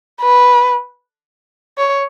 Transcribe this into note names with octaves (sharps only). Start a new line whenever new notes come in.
B4
C#5